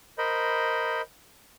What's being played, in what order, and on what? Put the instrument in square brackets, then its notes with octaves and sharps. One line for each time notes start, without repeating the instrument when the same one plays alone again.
[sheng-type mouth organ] A#4 C5 D#5 B5